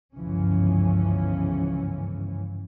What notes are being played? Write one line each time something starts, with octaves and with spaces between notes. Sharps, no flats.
G1 C#2 G#2 E3 F3 C#4